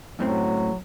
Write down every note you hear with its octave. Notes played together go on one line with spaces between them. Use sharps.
F#2 A2 F#3 C4